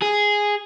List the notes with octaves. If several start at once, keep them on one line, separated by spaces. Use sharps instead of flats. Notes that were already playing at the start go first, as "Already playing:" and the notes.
G#4